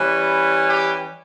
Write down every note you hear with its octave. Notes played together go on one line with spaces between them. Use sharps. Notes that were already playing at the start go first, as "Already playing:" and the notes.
Already playing: E3 G3 C#4
G4